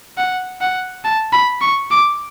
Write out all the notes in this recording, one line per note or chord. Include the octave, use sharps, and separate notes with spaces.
F#5
F#5
A5
B5
C#6
D6